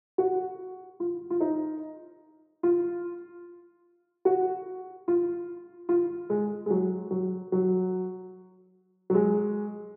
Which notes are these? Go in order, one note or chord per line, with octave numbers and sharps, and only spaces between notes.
F#4
F4
F4
D#4
F4
F#4
F4
F4
G#3
G#3
F#3
F#3
F#3
F#3
G#3